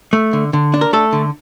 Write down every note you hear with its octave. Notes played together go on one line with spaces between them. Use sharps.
A3
D3
D3
D4
A#4
A3 A4
D3